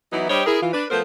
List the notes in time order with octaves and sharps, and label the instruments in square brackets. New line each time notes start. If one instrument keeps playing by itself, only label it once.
[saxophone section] E3 F#3 B3 D#4 E4
G3 D4 G4 C5 C#5 D#5
E4 G#4 A#4
E3 F4
D4 B4
F3 A3 B3 A#4 C5